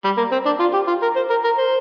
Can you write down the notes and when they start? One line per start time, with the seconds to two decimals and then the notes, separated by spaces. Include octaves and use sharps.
0.04 G3
0.17 A#3
0.32 C4
0.46 D4
0.60 F4
0.73 G4
0.88 F4
1.02 A#4
1.16 C5
1.30 A#4
1.44 A#4
1.58 C5